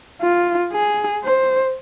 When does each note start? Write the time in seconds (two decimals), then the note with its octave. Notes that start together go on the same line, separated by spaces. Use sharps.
0.22 F4
0.73 G#4
1.24 C5